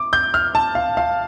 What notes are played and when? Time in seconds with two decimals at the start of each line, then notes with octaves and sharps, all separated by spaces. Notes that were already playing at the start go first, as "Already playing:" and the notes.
Already playing: D6
0.13 G6
0.34 F6
0.55 A5
0.75 F5
0.97 F5